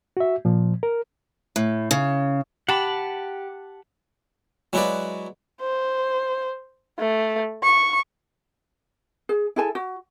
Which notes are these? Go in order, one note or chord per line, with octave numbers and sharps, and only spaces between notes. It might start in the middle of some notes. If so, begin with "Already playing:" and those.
F#4 E5
A#2 F3
A#4
A2
C#3
G4 F#5 A5 B5
F#3 G#3 E4 F#4 B4 D5
C5
A3
C#6
G#4
E4 G#4 A4 G#5
F#4